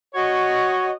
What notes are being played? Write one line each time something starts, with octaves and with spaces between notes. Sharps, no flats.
F#4 C#5 D#5